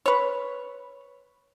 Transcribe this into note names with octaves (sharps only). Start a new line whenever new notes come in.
B4 C#5